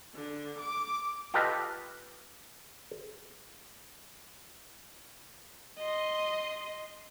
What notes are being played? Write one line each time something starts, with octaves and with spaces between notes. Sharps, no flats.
D3
D6
F4 G4 A4 B4 D#5 F5
D#5 C6